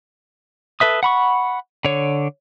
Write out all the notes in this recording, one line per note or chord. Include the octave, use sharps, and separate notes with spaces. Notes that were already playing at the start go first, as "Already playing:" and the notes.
A4 B4 E5 D#6
F#5 B5 C#6
D3 C#5